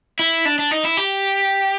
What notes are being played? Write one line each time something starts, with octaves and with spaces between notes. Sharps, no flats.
E4
D4
D4
D#4
E4
G4